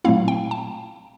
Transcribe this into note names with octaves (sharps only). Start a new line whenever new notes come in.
A#2 F#3 A3 C4 E4 F5
G5
A5